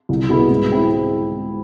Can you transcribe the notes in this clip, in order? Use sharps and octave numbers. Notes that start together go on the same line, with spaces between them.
C2
B2 B3 E4 G#4
G#2
G#3 C4 E4